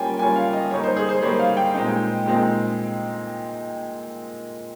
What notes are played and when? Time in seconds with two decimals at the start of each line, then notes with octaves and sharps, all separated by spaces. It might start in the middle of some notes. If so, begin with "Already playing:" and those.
Already playing: G3 A#3 C#4 F4 G5 G#5
0.19 G3 A#3 C#4 F4 G#5
0.36 F5
0.53 D#5
0.70 G3 A#3 D#4 C#5
0.83 C5
0.96 G#4
1.09 C5
1.22 G3 A#3 D#4 C#5
1.39 F5
1.57 G5
1.74 A#2 G#3 C4 D#4
2.26 A#2 G#3 C4 D#4